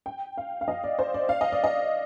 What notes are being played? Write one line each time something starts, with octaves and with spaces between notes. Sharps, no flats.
G5
F5
F5
D#5
D5
C5
D5
F5
D#5
D5
D#5